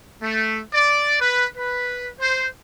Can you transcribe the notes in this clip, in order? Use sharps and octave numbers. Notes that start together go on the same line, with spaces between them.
A3
D5
B4
B4
C5